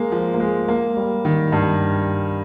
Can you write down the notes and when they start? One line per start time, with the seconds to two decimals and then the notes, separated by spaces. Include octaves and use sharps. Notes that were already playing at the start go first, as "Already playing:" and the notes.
Already playing: G#3 A#3
0.12 F3
0.34 A#3
0.40 G#3
0.68 A#3
0.97 G3
1.25 D#3
1.52 G2